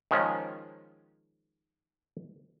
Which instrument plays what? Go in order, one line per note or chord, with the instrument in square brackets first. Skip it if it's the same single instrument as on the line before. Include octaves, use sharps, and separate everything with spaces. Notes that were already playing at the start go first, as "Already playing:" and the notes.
[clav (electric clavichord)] D#3 F3 G#3 C#4